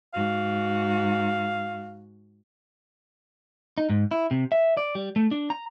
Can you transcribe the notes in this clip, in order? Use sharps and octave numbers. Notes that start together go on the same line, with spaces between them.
G#2 F#4 F5
D#4
G#2
E4
C3
E5
D5
G3
A3
D4
A#5